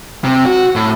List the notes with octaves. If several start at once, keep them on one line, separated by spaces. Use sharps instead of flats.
C3
F#4
A2